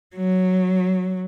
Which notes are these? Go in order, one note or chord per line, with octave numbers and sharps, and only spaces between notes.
F#3